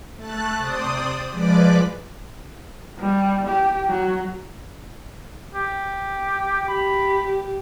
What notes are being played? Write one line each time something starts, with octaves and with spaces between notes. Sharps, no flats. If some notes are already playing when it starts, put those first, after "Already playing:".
A3 A5 F#6
C3 C5 D5 D#6
F3 G#3 B4 D5 D6
G3
G4
F#3
G4
G4 B5